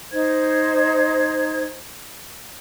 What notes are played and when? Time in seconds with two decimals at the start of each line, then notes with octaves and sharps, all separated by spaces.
0.12 D#4 C5 G#6